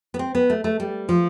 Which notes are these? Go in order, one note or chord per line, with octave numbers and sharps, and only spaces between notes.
B3
C4
B3
A3
A3
G3
F3